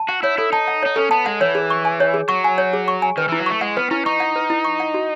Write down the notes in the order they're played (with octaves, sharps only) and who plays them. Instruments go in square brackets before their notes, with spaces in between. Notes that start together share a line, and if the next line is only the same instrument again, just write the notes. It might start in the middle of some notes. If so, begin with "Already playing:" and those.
Already playing: [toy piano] A5
[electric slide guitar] F#4 [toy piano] F#5
[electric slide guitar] E4 [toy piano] C#5
[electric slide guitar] E4 [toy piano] A4
[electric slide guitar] D#4 [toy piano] A5
[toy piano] F#5
[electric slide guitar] D#4 [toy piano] C#5
[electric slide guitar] C#4 [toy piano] A4
[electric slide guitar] B3 [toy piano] A5
[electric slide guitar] G#3 [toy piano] F#5
[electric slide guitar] E3 [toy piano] C#5
[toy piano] G#4
C#6
G#5
C#5
G#4
[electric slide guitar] F#3 [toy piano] C#6
[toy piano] G#5
C#5
G#4
C#6
G#5
[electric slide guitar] D#3 [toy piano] B4
[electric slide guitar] E3 [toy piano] E4
[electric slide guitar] F#3
[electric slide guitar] A3 [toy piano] C#6
[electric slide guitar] G#3 [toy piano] F#5
[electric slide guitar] B3 [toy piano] B4
[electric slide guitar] C#4 [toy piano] E4
[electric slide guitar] D#4 [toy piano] C#6
[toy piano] F#5
B4
E4
C#6
F#5
F#4